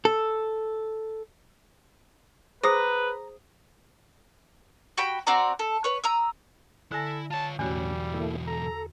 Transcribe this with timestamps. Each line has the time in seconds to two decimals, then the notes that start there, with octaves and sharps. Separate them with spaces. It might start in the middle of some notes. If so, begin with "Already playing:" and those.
0.05 A4
2.63 G#4 B4 C5 A#5 D#6
4.98 F#4 G4 G5 B5
5.27 C4 F#4 D5 A#5
5.59 A4
5.84 B4 C#5
6.04 A#5 D#6 E6
6.92 D3 E4 A4 G#5 A#6
7.30 F4 C#5 A5
7.59 B1 E2 A2 E3 G3 C#4 F#4
8.14 A#3 E4 A4
8.47 A4 A#5